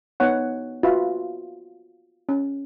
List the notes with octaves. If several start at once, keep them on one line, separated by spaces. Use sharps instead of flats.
B3 D#4 C#5 F#5
F4 F#4 B4 E5 B5
C#4